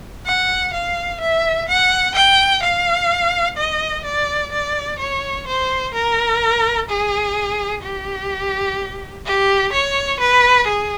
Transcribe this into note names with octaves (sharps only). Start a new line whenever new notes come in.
F#5
F5
E5
F#5
G5
F5
D#5
D5
D5
C#5
C5
A#4
G#4
G4
G4
C#5
B4
G#4